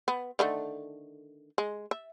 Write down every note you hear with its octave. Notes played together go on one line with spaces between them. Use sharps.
B3
D3 D#3 A3
G#3
E5